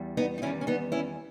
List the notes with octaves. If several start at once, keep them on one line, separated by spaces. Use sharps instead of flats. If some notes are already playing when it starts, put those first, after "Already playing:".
Already playing: E2 G3
B3 D#4
D#4
E2 D#3 G3 C#4 E4
C#4
B3 D#4
C#4 E4